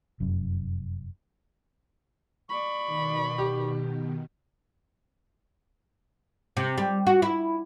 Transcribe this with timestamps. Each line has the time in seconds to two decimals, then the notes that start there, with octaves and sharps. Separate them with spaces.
0.20 F1 F#2
2.49 D5 B5 C#6
2.87 B2 D#3
3.38 G4
6.57 C3
6.78 G3
7.07 F#4
7.22 E4